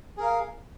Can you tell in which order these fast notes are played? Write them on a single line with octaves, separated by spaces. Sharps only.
G#4 A#4 F5